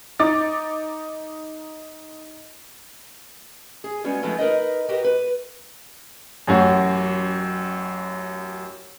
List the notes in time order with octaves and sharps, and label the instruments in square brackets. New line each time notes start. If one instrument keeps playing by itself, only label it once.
[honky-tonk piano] D#4 D6 A6
[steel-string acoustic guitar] G#4
G3 G#3 B3 C#4 F#4
E3 F3 G#3 A3 B3 D#4
D#4 A#4 B4 D#5
F#4 G4 A#4 B4 D#5
B4
[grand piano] A1 F#2 F#4